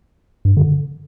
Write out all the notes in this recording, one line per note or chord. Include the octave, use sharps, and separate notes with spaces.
G2
D3